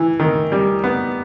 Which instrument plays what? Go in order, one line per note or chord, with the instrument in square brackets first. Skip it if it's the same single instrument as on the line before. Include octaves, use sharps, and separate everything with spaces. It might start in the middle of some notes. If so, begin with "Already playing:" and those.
Already playing: [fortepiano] E3
D#3
G3
B3